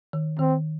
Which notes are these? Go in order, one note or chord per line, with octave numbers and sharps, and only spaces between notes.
D#3
D#3 C4